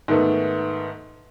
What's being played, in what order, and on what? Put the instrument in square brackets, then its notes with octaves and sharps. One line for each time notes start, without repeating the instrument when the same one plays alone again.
[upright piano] G#2 D#3 A3 B3